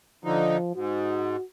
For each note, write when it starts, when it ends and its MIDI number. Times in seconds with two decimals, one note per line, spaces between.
0.25 0.57 50
0.25 0.71 53
0.25 0.57 63
0.76 1.36 44
0.76 1.44 66